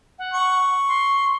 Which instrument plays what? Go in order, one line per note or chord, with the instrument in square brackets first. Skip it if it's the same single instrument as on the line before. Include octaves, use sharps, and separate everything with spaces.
[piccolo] F#5
[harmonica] C#6
[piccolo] C6